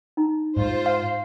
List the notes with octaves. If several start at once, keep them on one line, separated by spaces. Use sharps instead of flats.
D#4 A#5
G#2 G#3 F4 C5
F5